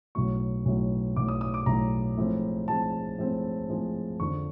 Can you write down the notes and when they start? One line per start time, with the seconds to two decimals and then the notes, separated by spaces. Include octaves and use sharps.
0.15 B1 A2 F#3 C#6
0.65 B1 A2 F#3
1.16 B1 A2 F#3 D6
1.28 D#6
1.41 D#6
1.54 D6
1.66 B1 A2 F#3 A#5
2.17 A2 F3 G#3 C4
2.68 A2 F3 G#3 C4 A5
3.18 A2 F3 G#3 C4
3.69 A2 F3 G#3 C4
4.20 F2 D3 F3 C#6